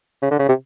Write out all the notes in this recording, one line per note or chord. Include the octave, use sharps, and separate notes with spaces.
C#3
D3
C#3
C3